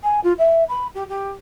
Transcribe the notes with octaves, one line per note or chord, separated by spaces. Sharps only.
G#5
F4
E5
B5
G4
G4